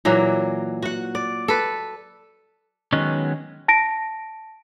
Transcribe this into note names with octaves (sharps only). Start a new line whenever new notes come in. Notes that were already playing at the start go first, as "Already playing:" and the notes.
A#2 E3 F#3 A#3
F#4 F#5
D5
A4 B4
D#3 F#3 G#3 B3 C#4
A5 A#6 D7